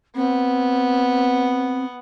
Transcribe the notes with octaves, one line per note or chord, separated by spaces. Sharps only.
B3 C4